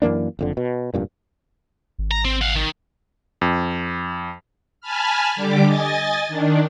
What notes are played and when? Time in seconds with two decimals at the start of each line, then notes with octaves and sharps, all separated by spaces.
0.02 F#2 E3 A#3 D4
0.39 F#1 F2 D3
0.57 B2
0.94 F1 G2 A#2
1.99 G#1
2.11 A#5
2.25 C4
2.41 F5 F#5
2.56 D#3
3.41 F2
4.81 G#5 A5 B5 F6
5.36 D3 G3 G4 D6
5.66 D#5 G#5 A6
6.28 D#3 D4